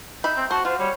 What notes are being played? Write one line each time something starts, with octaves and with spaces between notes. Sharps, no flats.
D#4 E5 B5 G6
C4
F#4 C5 A5
F4 F#4 C5
G3 C#5